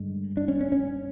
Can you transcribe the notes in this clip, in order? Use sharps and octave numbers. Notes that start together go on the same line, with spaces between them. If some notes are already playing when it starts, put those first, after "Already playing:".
Already playing: G2 D3 G#3
D4
C#4
C#4
C#4